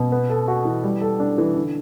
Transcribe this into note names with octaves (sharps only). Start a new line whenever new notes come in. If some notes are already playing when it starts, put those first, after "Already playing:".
Already playing: B2
B3
A4
F#4
E3
G3
A4
D4
E3
D3